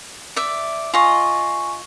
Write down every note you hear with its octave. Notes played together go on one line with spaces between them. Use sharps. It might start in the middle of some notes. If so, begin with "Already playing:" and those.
D5 E5
F4 D#5 G#5 C#6